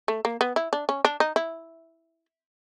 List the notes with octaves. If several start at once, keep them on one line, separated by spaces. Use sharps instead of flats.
A3
A#3
B3
E4
D4
C#4
D4
D#4
E4